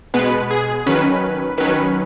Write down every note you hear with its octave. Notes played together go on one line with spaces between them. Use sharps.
B2 G#3 B3 B4
G#4
D#3 F#3 C#4 B4
D#3 F#3 C#4 B4